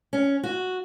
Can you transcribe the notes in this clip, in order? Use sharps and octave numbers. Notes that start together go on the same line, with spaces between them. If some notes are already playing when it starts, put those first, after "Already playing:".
C#4
F#4